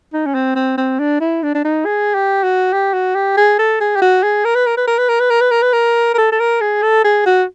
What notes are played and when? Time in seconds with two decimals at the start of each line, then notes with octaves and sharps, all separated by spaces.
0.13 D#4
0.26 C#4
0.34 C4
0.56 C4
0.78 C4
1.00 D4
1.21 E4
1.43 D4
1.55 D4
1.65 D#4
1.86 G#4
2.15 G4
2.43 F#4
2.73 G4
2.93 F#4
3.15 G4
3.37 G#4
3.59 A4
3.81 G#4
3.96 G4
4.02 F#4
4.23 G#4
4.45 A#4
4.55 B4
4.66 A#4
4.77 B4
4.87 A#4
4.98 B4
5.09 A#4
5.20 B4
5.30 A#4
5.41 B4
5.51 A#4
5.62 B4
5.73 A#4
6.14 A#4
6.18 A4
6.32 A4
6.40 A#4
6.61 G#4
6.82 A4
7.04 G#4
7.26 F#4